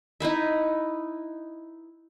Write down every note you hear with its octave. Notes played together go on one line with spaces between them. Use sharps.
D#4 E4 B4 E5